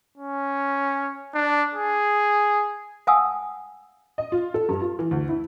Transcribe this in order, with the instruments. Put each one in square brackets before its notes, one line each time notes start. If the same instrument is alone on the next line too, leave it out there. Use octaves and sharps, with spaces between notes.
[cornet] C#4
D4
G#4
[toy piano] F5 F#5 G#5 A5 D#6 E6
[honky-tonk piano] D#5
F4
A4
G2
F4
E3
D2
E4